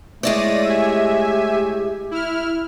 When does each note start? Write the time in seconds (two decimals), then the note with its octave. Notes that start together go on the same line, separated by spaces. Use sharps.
0.23 G#3 A3 E4 C#5 D5 A#6 D#7
0.65 G4 E5 G#5
2.11 E4 F6